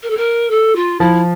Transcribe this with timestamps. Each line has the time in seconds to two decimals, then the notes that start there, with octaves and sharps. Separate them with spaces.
0.03 A#4
0.10 A4
0.17 A#4
0.50 A4
0.76 F4
1.00 F3 E4